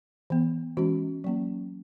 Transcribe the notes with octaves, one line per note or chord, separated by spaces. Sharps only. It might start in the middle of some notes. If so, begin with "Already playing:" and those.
E3 B3
E3 G#3 C#4 F#4
F#3 A#3 C#4